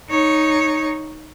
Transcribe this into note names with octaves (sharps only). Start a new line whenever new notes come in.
D#4 C#5